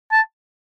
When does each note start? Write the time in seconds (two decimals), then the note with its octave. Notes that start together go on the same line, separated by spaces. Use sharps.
0.12 A5